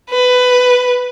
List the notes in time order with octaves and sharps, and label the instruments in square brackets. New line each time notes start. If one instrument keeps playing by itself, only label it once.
[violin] B4